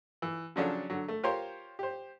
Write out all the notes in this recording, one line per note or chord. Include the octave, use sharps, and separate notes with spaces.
E3
C#3 F3 F#3 C#4 D4 A4
D3 F#3
A3
F4 G4 A#4 C5 C#5 C6
G4 C5